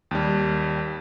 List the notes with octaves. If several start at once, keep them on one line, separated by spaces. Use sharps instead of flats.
D#2 G3